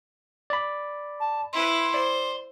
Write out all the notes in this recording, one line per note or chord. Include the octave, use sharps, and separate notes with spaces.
D5 B5
A5
E4 B4 C6
C5 D5